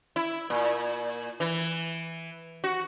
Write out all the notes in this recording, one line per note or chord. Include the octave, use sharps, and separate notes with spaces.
E4
A#2
E3
F#4